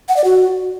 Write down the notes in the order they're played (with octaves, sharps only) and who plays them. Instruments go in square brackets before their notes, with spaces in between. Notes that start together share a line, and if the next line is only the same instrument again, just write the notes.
[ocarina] F#5
D5
F#4